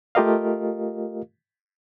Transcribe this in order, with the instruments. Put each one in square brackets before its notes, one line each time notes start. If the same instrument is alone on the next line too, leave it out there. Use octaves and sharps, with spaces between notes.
[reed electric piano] A3 F4 G4 A#4 D#5 F5